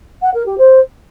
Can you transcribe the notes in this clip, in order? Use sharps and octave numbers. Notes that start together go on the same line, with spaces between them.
F#5
A#4
G4
C5